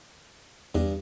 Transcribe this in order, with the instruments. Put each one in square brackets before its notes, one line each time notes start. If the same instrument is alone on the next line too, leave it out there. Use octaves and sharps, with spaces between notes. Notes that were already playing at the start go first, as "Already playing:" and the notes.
[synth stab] E2 [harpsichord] G2 D4 D#5